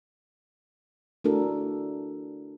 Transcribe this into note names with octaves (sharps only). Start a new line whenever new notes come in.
A3 D4 E4 F#4 A4 A#4